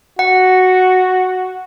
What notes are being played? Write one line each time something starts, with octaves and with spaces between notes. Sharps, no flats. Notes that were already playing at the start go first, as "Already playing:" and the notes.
F#4 F#5